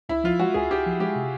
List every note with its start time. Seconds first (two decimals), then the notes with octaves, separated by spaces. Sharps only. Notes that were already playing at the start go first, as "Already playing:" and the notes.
0.09 C#2 E4
0.24 F3 F4
0.39 G#3 F#4
0.54 C#2 G#4
0.71 C#2 G4
0.86 F3
1.00 G#3 G4
1.16 C3